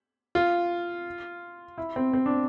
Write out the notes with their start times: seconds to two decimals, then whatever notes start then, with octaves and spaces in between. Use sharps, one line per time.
0.35 F4
1.78 E4
1.96 C4
2.13 C4
2.26 D4